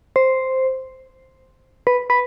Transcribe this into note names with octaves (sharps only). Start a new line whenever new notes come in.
C5
B4
B4